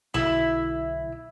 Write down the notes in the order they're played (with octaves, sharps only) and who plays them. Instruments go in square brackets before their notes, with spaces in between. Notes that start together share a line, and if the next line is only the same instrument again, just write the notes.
[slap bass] B1 D3 [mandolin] E4